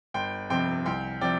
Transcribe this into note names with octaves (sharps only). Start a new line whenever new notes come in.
G1 G5 C6
F2 C3 F3 G5 C6
C2 G5 C6
C3 F3 D5 G5